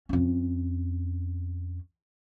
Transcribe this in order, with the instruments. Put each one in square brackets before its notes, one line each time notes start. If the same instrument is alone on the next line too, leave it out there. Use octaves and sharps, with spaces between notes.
[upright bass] F2 C#4